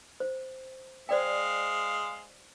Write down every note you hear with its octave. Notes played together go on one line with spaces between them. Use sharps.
C5
G#3 C5 D5 F5 G5